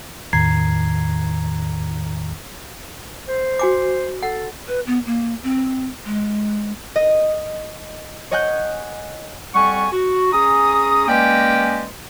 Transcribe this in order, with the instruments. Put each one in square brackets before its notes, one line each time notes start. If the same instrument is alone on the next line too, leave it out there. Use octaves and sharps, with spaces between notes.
[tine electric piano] E2 A2 D#3 A#5 G#6 C7
[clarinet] C5
[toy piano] F#4 G#5 D6
[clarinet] A4 [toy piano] F#5
[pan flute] B4
B3
A#3
C4
G#3
[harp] D#5
C#5 D#5 F#5 G#5 F#6 G6
[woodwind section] F2 G3 F#5 G#5 C#6
F#4
C#4 G#4 A#5 D#6
G#3 A#3 C#4 B4 D5 G5